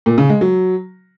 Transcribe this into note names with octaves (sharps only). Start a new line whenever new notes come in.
A#2
C#3
G#3
F#3